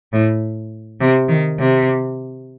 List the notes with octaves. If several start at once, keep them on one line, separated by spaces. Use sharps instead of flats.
A2
C3
D#3
C3